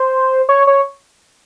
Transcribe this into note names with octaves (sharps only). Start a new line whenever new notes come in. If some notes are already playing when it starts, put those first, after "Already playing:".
Already playing: C5
C#5
C#5